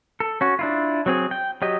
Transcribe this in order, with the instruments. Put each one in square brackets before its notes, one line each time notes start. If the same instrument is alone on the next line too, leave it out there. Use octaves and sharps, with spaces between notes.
[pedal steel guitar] A4
C#4 F#4
D4 E4 F4
F#3 C4 G#4
G5
F#3 G4 D#5